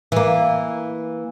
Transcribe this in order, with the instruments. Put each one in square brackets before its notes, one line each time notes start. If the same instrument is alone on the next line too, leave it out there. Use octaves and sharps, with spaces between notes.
[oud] E3 A#3